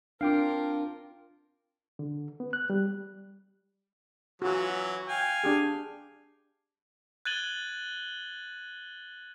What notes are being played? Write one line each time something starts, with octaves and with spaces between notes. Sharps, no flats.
C4 D4 F4 A#4 F5 G5 D6
D3
B3
F#6
G3
E3 F#3 C#4 F4 F#4
F5 G5 G#5
D4 G4 G#4
F#6 G#6 A6 D#7 F#7 G7